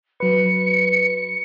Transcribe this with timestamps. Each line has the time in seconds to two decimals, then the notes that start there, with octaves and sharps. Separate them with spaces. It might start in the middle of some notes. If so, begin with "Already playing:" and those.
0.20 F#3 B4 C#7